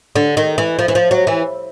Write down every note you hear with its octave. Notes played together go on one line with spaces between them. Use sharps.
D3
D#3
E3
F3
E3
F3
F#3
E3